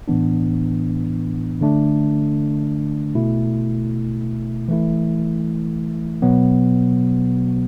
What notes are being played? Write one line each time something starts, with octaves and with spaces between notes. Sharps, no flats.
A2 E3 B3 D4
D3 A3 D4
B2 A3 E4
E3 A3 E4
B2 F#3 B3